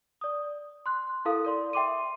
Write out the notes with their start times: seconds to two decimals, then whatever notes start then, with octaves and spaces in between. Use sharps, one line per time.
0.21 D5 D#6
0.86 C6 F#6
1.25 E4 A4 A#4 F5 D#6
1.45 A#4 D5 C6
1.73 E5 G5 C6 D6 D#7